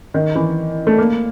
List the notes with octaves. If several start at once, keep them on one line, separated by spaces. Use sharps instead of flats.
D#3
E3
A3
A#3